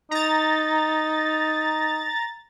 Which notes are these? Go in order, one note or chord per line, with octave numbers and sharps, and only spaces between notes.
D#4 A#5 A6